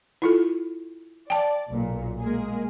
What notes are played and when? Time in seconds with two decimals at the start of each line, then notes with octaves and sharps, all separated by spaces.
0.22 E4 F4 A4
1.30 D5 G5 A5
1.70 B1 A#2
2.20 G#3 A#3 G#4